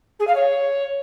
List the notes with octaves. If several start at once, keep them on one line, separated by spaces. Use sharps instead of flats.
G#4
F5
C#5